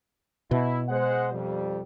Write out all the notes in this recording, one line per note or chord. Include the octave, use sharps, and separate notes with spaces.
B2 E4
G#3 C5 F#5
F2 F3 G3